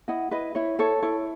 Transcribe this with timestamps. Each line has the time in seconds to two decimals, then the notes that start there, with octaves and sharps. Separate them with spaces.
0.08 E4 D#5 F#5
0.31 E4 B4 D#5
0.55 E4 C#5
0.79 A4 C#5
1.02 E4 C#5